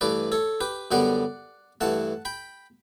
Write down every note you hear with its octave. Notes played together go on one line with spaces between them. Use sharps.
G2 E3 A3 B4 D5
A4 C#5
G4 B4
F#2 D3 G3 B3 D5 F#5
G2 E3 A3 F#5 A5
G5 B5